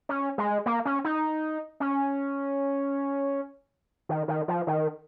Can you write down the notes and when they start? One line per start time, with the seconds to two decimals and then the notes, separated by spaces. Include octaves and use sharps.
0.09 C#4
0.38 G#3
0.66 A#3
0.85 C#4
1.04 D#4
1.80 C#4
4.09 D#3
4.28 D#3
4.48 F3
4.67 D#3